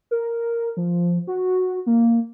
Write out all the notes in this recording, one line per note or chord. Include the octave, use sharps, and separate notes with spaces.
A#4
F3
F#4
A#3